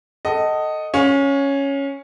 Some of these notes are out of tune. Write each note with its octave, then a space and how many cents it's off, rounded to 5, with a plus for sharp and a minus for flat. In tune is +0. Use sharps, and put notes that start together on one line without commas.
A4 +10 D#5 +0 F#5 +40
C#4 +0 F5 +35